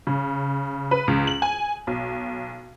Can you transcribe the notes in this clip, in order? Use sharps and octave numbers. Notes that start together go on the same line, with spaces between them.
C#3
B4
C#2
F#7
G#5
B1